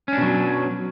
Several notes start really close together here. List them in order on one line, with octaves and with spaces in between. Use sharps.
C#4 D4 B2 F#3